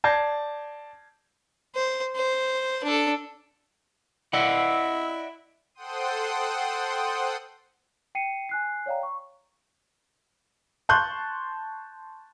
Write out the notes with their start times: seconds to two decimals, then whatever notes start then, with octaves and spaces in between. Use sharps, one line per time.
0.04 D5 A5 G6 G#6 A#6 C7
1.75 C5
2.16 C5
2.84 D4 A4
4.33 E4 D5 D#5 F#5 E6
5.75 A4 C5 F#5 G5 C6 D#6
8.15 G5 C7 C#7 D#7
8.49 G#5 F#6 C7
8.86 C#5 D5 F5 G5 A#5
9.03 C#6
10.89 A5 C6 C#6 F#6 G6